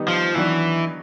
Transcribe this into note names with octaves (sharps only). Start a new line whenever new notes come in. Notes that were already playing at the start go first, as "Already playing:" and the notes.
Already playing: D#3 G3 B3 D#4 G4
F3
D#3 E3 F#3 B3 D4 F#4